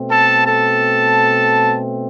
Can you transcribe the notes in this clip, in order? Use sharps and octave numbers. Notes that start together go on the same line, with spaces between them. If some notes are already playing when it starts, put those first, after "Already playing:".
Already playing: B2 A3 C4
A4 A5
A4 A5